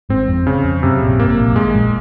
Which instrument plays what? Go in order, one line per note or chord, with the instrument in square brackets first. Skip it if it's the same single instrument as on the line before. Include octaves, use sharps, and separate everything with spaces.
[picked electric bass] G#1 G#2 [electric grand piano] C4
[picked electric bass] F2
[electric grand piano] C#3
[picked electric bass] F2
[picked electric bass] F#2 [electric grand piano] C3
[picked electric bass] A#1 A#2
[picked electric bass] G#1 G#2 [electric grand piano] A#3
[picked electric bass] A#1 A#2
F#2
[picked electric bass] G#1 G#2 [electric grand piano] G#3
[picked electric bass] A#1 A#2